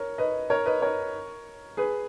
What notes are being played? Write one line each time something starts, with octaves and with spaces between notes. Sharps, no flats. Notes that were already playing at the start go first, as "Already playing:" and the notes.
Already playing: A#4 C#5
B4 D#5
A#4 C#5
B4 D#5
A#4 C#5
G#4 B4